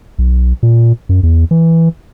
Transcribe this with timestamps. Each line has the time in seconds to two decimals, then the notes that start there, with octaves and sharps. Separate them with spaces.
0.19 B1
0.63 A#2
1.09 F#2
1.23 E2
1.51 E3